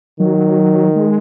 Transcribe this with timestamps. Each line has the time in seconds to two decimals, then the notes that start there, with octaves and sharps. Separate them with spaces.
0.20 D#3 F#3
0.96 G#3